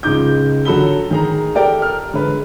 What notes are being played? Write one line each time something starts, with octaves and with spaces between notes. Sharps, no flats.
C#2 G#3 D#4 D6 G6
D3 F#3 F#4 A4 B5 G7
D#3 G#4 A#5
G4 A4 A#4 D5 G5
F6
D3 G#3 B4